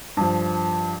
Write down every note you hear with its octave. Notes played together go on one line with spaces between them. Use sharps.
G2 F3